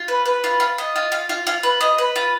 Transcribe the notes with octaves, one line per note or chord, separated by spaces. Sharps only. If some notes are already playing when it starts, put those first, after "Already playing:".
Already playing: F4
B4
B4
F4
F4
D#5
F4
F4
F4
F4
B4
D#5
B4
F4